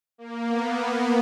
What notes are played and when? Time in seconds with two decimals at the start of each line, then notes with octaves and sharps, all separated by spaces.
0.18 A#3
0.49 B3
0.78 B3